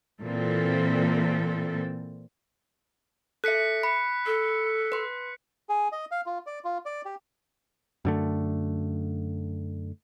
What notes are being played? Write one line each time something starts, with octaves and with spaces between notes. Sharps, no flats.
A#2 E3 C4 A4
A4 E5 F#6 B6 C#7
B5 C#7
A4
B4 C6
G#4
D#5
F5
F4
D5
F4
D5
G4
F#2 D3 A3